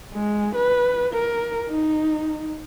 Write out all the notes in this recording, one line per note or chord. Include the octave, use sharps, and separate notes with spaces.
G#3
B4
A#4
D#4